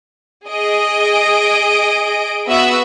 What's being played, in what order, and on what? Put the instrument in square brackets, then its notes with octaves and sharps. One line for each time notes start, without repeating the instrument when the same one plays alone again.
[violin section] G#4 D#5 D7
B3 F#4 E5 F#5 E6